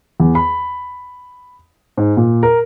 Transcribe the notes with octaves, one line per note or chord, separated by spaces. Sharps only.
E2
B5
G#2
A#2
A#4